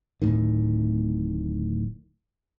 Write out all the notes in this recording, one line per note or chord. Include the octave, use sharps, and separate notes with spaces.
D1 A2 D#3